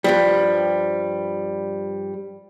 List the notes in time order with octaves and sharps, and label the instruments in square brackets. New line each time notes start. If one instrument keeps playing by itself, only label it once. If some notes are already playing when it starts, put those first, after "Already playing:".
[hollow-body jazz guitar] G2 F3 G3